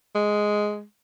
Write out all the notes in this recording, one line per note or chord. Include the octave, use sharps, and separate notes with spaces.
G#3